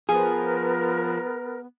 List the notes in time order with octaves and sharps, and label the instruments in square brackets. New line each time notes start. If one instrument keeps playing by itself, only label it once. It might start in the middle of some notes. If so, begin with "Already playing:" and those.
[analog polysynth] F3 [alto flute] B3 [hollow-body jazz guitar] G#4 [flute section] A#4 B4